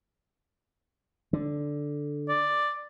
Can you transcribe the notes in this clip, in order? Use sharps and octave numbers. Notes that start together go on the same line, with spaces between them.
D3
D5